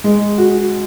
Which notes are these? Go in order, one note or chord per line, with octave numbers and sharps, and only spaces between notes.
G#3
F#4